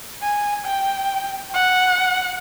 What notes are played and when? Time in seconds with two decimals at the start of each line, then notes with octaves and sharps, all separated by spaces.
0.22 G#5
0.64 G5
1.54 F#5